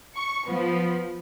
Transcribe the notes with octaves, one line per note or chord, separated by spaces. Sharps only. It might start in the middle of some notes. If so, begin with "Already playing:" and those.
C#6
F3 B3